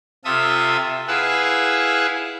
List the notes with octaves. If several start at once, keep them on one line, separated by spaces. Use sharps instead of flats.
C3 F4 A4 E5 D#6 E6
E4 G#4 B4 F5 F#5 E6